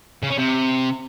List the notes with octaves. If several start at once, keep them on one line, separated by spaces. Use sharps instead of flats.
C#3
C#4
C3